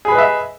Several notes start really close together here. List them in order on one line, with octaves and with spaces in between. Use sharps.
G#4 B5 B4 D#5 E5